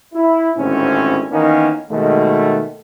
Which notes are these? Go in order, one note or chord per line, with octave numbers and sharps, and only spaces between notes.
E4
G#1 A2 D3 C4 C#4
D#3 E3 A#3 B3 C#4 D#4
D#2 B2 D#3 G#3 A3